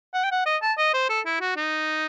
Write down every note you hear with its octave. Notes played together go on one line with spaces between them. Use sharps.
F#5
G5
F#5
D#5
A5
D#5
C5
A4
E4
F#4
D#4